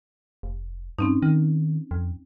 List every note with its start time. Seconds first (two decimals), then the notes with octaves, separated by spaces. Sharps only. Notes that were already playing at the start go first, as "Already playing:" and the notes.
0.43 F1
0.99 G2 C4 C#4 D#4
1.22 D#3
1.91 F2